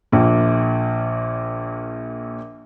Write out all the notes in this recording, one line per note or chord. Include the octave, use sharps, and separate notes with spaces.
A#1 A#2